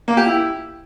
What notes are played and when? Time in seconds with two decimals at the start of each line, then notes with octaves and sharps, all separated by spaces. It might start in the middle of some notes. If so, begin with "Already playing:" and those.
0.08 A#3
0.17 G4
0.26 E4